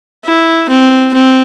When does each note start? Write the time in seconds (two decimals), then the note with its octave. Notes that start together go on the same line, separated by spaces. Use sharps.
0.25 E4
0.69 C4
1.14 C4